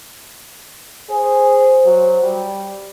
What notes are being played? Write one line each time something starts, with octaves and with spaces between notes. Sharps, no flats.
G#4 C5
F#3
G3